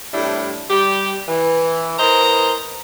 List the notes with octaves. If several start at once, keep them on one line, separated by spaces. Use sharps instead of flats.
A2 C3 G3 D4 E4
G3 G4
E3
E3 A#4 C5 D#5 A#5